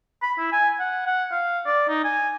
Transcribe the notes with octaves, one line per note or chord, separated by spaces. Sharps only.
B5
E4
G#5
F#5
F#5
F5
D5
D#4
G#5